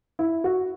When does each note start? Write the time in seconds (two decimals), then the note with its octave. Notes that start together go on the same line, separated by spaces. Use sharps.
0.19 E4
0.44 F#4